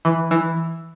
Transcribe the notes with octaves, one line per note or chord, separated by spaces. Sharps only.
E3
E3